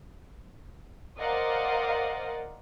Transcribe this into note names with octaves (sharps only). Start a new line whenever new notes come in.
A#4 C5 D5 D#5 F5 F#5